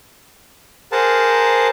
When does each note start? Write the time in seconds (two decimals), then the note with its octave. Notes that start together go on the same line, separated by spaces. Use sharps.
0.92 G#4 A#4 C5 F#5 A5